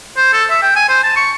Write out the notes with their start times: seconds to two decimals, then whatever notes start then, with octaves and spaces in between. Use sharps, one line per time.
0.17 C5
0.33 A4
0.50 E5
0.62 G5
0.76 G#5
0.89 C5
1.04 A5
1.16 C#6